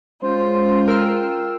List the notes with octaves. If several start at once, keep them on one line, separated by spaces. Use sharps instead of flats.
G#3 C#4 F4 C5
A#4 G5 E6 F6